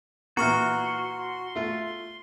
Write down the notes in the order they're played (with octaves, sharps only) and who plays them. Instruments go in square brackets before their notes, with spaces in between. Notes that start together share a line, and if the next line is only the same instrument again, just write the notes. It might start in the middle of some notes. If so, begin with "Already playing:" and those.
[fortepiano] A#2 E3 [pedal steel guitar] F#4 [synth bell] A#5 C#6 F6 [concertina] C6
[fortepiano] A3 F4